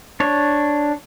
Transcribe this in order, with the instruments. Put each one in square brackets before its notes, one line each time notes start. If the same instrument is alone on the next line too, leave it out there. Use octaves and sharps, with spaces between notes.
[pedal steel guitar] D4 C#5